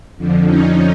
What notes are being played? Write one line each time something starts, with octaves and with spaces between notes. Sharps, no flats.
F2 D3 F3
C#4 D#4